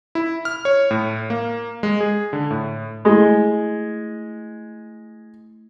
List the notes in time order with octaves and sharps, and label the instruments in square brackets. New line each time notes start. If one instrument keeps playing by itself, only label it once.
[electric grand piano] E4
F6
C#5
A2
A#3
G#3
G#4
D3
A2
[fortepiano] G#3 [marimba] A3 E4